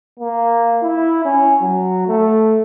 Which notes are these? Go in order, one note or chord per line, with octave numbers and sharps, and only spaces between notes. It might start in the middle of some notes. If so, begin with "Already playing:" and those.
A#3
E4
C#4
F#3
A3